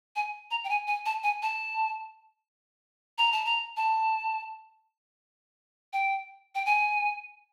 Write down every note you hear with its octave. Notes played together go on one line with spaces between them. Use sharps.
G#5
A#5
G5
G#5
G#5
A5
G#5
A5
A#5
A5
A#5
A5
G5
G5
G#5